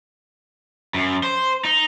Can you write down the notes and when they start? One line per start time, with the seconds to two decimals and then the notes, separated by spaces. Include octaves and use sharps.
0.94 F#2
1.23 C5
1.64 D#4